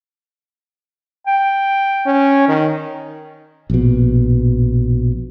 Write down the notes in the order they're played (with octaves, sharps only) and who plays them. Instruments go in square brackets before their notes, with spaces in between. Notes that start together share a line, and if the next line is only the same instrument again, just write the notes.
[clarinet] G5
[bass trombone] C#4
D#3
[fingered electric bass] A#1 B2